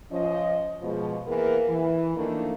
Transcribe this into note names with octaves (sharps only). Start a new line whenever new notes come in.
F3 C#4 D#5
B2 F3 G#3
E3 A#3 B3 G#4 A#4
E3
D#3 F3 A3 A#3 D4 D#4